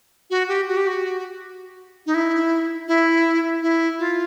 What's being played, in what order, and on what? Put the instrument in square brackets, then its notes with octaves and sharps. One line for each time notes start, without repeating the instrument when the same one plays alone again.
[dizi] F#4
G4
F#4
G4
F#4
D#4
E4
E4
E4
F4